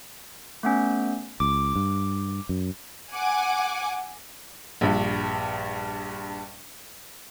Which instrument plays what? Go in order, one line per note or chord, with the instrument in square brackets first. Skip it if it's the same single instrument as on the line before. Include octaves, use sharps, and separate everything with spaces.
[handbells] A3 B3 C#4
[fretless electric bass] C#2 [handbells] D6
[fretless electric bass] G2
F#2
[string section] F#5 G#5 D6
[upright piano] A#1 G2